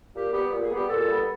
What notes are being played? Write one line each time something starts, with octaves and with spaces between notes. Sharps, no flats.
A#2 G4
G3 B3 G4
A#2 G4
G#4
G3 B3 G4
A#2 A4
G3 B3